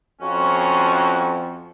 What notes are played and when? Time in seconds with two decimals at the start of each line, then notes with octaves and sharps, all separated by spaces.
0.22 F2 C#4 F4 F#4